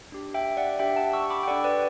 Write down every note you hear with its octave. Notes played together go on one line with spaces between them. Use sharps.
D4 G4
E5 G5
D5 F#5
D4 G4 E5 G5
F#5 A5
C#6 E6
B5 D6
G5
D4 A4 D5 F#5
B4 D5